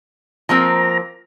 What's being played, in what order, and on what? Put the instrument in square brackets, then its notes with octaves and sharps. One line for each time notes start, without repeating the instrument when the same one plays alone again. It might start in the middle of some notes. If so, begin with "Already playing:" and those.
[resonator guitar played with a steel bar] F3 A#3 C4 [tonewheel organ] A#5